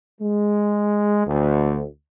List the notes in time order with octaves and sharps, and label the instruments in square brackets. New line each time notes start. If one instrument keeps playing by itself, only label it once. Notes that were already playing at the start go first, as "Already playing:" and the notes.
[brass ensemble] G#3
D2